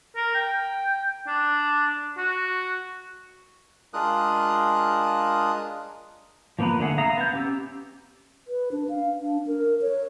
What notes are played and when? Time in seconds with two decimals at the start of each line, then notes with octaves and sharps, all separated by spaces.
0.16 A#4
0.35 G5
1.27 D4
2.17 F#4
3.94 G#3 D4 F4 A#4 D#6 F#6
6.59 F3 A#3 B3 A#4 B4
6.79 D3 A3 G#4 F#5
6.98 E5 F5 A#5 D#6
7.17 B3 G6
7.34 C#4 G4 E6
8.48 B4
8.72 D4
8.89 F5
9.21 D4
9.47 A#4
9.82 C#5